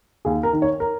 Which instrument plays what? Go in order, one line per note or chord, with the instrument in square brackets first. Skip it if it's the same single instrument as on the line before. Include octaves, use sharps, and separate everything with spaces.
[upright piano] D#2 G#4
A#4
D#3
C#5
A#4